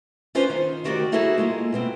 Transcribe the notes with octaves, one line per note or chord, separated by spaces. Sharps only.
C#4 D4 F4 B4 C5
D#3 F4
D2 D#3 F#4 G4 A#4 D5
D#4 E4 F#4 G#4 A4 C#5
G#3 A#3 F4
B2 B3 C4